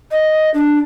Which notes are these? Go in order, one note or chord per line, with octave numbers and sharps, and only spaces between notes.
D#5
D4